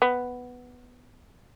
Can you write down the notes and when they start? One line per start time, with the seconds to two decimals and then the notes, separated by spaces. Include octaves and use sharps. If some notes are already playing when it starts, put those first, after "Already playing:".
0.02 B3